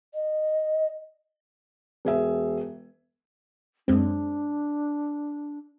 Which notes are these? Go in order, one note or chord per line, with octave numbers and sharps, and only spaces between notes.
D#5
E1 G#4 E5
F#2 G#3 C4 D4